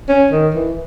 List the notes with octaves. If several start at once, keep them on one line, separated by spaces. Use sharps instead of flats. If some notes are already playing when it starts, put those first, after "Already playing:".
C#4
D#3
E3